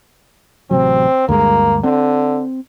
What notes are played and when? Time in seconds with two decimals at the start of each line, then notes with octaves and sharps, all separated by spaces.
0.71 A1 C3 F#3 C4
1.29 D2 G2 G#3 A#3
1.84 D3 C4